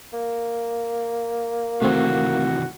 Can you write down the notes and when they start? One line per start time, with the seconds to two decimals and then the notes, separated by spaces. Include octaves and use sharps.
0.13 A#3
1.82 C3 D#3 E3 A3 C4 F#4